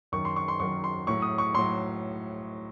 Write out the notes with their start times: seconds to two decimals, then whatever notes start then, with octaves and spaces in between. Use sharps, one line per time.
0.12 F#2 D#3 F#3 C#6
0.25 C6
0.36 C#6
0.48 C6
0.60 F#2 D#3 F#3 C#6
0.84 C6
1.07 A2 F#3 C#6
1.22 D#6
1.38 C#6
1.54 A2 F#3 C6